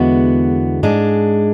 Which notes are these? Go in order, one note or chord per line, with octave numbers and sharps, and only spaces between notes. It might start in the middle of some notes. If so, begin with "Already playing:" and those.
Already playing: E2 D3 G#3 B3 F#4
G#2 G#3 D4